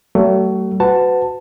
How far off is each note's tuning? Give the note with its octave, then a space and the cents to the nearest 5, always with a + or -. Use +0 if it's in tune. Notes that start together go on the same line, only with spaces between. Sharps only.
F#3 +45 A3 +25
F#4 +0 B4 +35 A5 +10